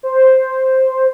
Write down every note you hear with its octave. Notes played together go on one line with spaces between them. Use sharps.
C5